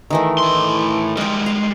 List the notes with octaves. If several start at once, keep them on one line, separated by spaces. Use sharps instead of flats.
D#3 E3 A3
A2 C6
G3 G#3 D#5 G5
F5